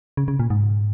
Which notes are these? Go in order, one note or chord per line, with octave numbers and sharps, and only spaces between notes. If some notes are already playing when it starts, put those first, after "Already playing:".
C#3
C#3
A#2
G#2